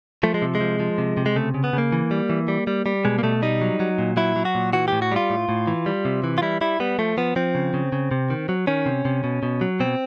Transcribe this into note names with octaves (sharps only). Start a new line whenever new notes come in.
F3 A3
G#3
C3
G#3
F3
F3
C3
C3
G#3
C#3 A3
C#3
B3
C#3 A#3
E3
G3
E3
G3
G3
G3
B2 G#3
A#3
B2 A3
G3 D#4
F#3
F#3
A#2
F#3 E4
F#3
F#4
A#2
E3 F#4
A2 G4
F#4
G3 F4
A2
A2
E3
G3
C3
E3
F4
G3 E4
G3 E4
G3 B3
F3 A3
F3 B3
F3 C4
C#3
C#3
C#3
C3
D#3
F#3
D#3 C#4
C3
C3
B2
B2
F#3
B2 C4